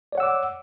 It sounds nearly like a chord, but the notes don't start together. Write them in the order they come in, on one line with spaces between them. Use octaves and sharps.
D5 C#5 F#5 E6 D6